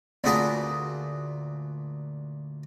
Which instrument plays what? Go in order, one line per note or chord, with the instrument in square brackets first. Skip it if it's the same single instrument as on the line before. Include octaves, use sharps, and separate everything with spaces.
[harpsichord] D2 A#2 F#4 G#4 B4 A5